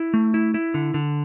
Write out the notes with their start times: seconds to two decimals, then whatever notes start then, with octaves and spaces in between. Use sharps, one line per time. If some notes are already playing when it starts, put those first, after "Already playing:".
Already playing: E4
0.14 A3
0.34 E4
0.54 E4
0.74 D3
0.94 D3